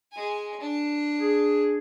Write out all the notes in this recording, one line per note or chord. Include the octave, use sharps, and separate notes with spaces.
G#3 G#5
D4
G#4